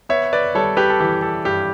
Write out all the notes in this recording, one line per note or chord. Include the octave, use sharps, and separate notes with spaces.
B3 C#5 E5
B4 D5
G3 A4 C#5
G4 B4
A4
E3 G4
A4
G2 G4